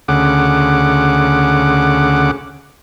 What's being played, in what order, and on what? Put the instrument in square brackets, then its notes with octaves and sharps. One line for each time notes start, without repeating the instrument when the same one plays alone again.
[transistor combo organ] D2 C#3 F#5 D6